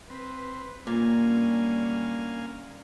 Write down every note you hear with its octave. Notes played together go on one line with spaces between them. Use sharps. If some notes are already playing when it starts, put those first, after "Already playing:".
C4 B4
A#2 D3 G3 A#3 C#4 F5 G#5